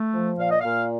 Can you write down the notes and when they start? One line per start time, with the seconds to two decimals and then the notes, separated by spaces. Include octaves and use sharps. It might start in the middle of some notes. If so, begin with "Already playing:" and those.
Already playing: A3
0.13 F3
0.38 A#2 F5
0.50 D#5
0.60 A#2 F5